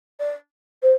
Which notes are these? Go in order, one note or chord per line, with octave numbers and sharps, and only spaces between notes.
D5
C5